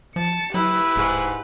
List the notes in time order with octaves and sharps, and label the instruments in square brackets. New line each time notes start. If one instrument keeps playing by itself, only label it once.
[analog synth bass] F3 [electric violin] A5 C#7
[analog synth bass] F#3 [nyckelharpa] E4 [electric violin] G4 B4
[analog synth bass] D1 [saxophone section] G#2